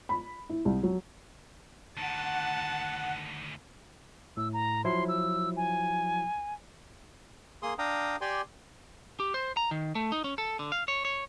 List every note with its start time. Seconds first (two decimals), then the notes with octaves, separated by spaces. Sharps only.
0.09 B5
0.50 E4
0.65 C2
0.83 F#3
1.97 D2 D#3 F#5 A5
4.37 A2 E6
4.53 A#5
4.85 F3 F#3 E4 C6
5.08 E6
5.57 G#5
7.63 A#3 G#4 C6 D#6
7.79 D4 F5 G5 A#5 D#6
8.21 G4 D5 G5 G#5 C6
9.20 G4
9.34 C5
9.57 A#5
9.71 D#3
9.95 A3
10.12 D#4
10.24 C#4
10.38 A4
10.59 D3
10.72 F5
10.88 C#5
11.05 C#5